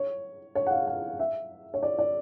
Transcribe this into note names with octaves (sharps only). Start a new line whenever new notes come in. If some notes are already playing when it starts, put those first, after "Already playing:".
Already playing: C#5
C#5
F#5
F5
F5
E5
C#5
D5
D5